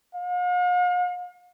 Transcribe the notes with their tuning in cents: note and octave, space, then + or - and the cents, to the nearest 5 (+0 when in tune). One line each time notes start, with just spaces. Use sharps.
F5 +45